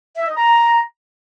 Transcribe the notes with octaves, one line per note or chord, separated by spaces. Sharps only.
E5
D#5
A#5